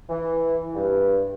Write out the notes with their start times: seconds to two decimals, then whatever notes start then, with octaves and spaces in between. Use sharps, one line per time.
0.09 E3
0.75 G2